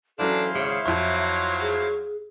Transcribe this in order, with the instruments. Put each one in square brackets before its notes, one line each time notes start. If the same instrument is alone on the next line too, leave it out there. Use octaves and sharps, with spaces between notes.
[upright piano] E3 F#3 C#4 [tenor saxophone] D4 [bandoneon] E4 C5 F5 [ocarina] A4
[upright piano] G#1 [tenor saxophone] C#3 [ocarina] E5
[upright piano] F2 C6 [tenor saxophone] F#3
[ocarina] G#4